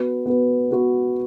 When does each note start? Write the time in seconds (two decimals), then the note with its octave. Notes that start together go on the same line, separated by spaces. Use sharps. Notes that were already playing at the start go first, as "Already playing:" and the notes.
Already playing: B3 F#4 B4
0.26 B3 F#4 B4
0.71 B3 F#4 B4